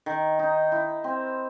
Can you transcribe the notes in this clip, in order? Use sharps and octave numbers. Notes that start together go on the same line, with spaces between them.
D#3
D#4
E4
C4